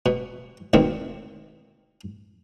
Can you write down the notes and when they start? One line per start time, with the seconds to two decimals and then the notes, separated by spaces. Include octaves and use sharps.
0.06 B2
0.73 D2 B2 D#3 C4